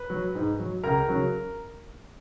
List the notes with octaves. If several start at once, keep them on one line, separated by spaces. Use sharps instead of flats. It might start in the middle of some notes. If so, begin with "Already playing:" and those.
Already playing: B4
F#3
G#2
F#3
C#2 A#4 A#5
C#3 F#3